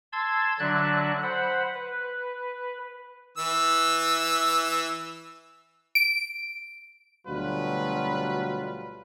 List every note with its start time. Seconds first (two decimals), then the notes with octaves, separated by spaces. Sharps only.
0.13 A5 C6 E6 G#6
0.59 D3 F#3 D4 D5 E5 F#6
1.23 C5 F#5 B5
1.74 B4
3.38 E3 E6
5.95 D7
7.27 D2 B2 F#3 G3 F4 B4